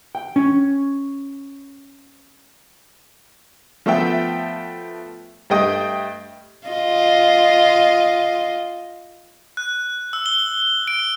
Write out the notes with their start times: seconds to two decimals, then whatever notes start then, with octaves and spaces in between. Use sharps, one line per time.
0.15 G5
0.36 C#4
3.86 F3 A3 B3 E5 G5
5.50 G2 A3 D#5 G5 D#6
6.67 F4 D#5
9.57 F#6
10.13 E6
10.26 G7
10.88 D7